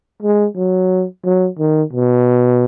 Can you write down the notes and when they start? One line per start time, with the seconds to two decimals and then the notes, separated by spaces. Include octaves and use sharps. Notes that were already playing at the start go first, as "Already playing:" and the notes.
0.22 G#3
0.57 F#3
1.25 F#3
1.59 D#3
1.93 B2